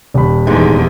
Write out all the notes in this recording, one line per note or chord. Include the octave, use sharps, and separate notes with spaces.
D#1 B5
E2 G#2 D3